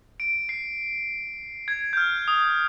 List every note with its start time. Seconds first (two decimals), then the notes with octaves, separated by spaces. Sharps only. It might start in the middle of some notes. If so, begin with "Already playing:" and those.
0.20 D7
0.49 C7
1.68 G#6
1.93 G6
1.97 F6
2.28 D#6